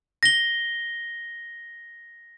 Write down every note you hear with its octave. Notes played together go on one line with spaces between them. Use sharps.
A#6 G7